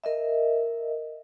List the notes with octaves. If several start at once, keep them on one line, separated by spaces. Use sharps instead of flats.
A#4 D#5 E5